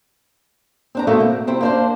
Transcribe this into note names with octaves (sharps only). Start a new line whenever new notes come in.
C4 D4 A#5
B2 D3 A3 A#3 F4 F#4
C4
C3 C4 E4
A#3 D4 C5